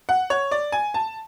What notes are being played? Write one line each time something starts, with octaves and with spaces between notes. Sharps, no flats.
F#5
C#5
D5
G#5
A5